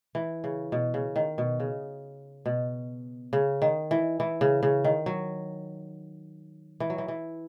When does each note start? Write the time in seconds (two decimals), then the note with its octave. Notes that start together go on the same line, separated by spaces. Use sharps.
0.15 E3
0.44 C#3
0.72 B2
0.94 C#3
1.16 D#3
1.38 B2
1.60 C#3
2.46 B2
3.33 C#3
3.62 D#3
3.91 E3
4.20 E3
4.41 C#3
4.63 C#3
4.84 D#3
5.06 F#3
6.80 E3
6.90 F#3
6.98 E3
7.08 E3